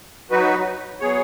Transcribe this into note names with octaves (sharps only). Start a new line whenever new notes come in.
F#3 D#4 F#4 B4
F#3 B3 G#4 C#5